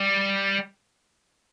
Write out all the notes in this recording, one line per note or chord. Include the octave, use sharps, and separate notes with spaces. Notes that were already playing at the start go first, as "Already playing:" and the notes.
Already playing: G3